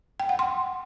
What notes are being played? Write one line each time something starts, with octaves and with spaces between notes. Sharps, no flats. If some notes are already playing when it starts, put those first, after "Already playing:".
G5
F#5
C6